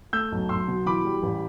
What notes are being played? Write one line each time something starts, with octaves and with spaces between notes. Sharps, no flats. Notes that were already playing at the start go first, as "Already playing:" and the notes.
A3 E6 G6
B1
B1 C6 E6
B2
E3 B5 D6
G3
A1